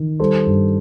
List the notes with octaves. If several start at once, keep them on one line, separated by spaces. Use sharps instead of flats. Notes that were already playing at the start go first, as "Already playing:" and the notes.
Already playing: D#3
G3 A4 C5
G2